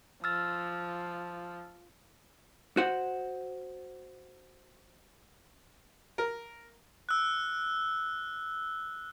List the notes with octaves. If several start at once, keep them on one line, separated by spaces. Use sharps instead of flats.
F3 E6 F6 A6
F#4 C5 F#5
A#4
E6 F#6